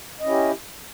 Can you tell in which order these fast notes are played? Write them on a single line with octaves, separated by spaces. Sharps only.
D#5 C#4 E4 G4